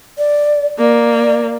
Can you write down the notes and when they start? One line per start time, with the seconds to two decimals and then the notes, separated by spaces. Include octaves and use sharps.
0.18 D5
0.79 A#3 D5